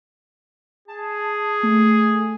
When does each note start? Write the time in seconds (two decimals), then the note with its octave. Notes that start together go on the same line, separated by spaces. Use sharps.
0.88 G#4 A5
1.63 A3